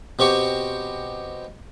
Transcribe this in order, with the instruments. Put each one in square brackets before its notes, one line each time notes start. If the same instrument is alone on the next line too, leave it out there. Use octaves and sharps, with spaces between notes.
[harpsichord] B2 C4 G4 C#6